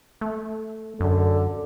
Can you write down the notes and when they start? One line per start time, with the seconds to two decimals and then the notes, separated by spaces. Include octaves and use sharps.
0.21 A3
1.00 F#2 D3